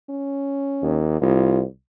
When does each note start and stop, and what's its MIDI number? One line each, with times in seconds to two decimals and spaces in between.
0.10 1.05 61
0.82 1.20 39
1.22 1.64 36
1.22 1.62 65